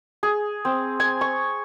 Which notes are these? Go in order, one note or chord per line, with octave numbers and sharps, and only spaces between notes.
G#4
C4
G#5
C#6